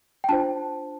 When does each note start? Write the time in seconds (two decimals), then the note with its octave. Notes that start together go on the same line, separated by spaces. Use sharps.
0.24 G5
0.29 D4 F4 C5 A5